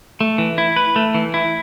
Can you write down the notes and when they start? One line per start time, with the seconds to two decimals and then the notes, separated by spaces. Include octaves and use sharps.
0.21 A3
0.38 E3
0.58 E4
0.76 B4
0.96 A3
1.14 E3
1.34 E4